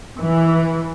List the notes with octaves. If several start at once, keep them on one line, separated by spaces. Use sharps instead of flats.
E3